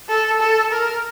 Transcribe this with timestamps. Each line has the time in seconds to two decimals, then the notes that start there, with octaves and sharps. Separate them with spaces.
0.09 A4
0.40 A4
0.72 A#4